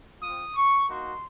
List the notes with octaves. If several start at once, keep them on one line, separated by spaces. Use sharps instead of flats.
C4 F4 D#6
C#6
A#3 D#4 F#4 C6